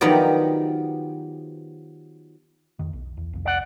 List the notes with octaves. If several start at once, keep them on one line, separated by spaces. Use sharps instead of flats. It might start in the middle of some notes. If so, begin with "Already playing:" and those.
D#3 F3 F#3 B3 G4 D5
F2 D#3
B1
E2
C2 F2
D5 F#5